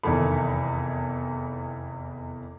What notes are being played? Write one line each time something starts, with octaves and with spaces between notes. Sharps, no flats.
F1 E2 D#3 E3 A4 B5